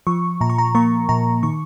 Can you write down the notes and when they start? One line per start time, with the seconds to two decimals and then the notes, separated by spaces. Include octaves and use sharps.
0.07 F3 C#6
0.40 A#2 A#5
0.50 C#6
0.58 A#5
0.75 A#3 C#6
1.09 A#2 A#5
1.43 D#3 C#6